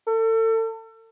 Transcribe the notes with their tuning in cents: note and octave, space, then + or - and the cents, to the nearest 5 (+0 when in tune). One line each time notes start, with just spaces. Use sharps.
A4 +35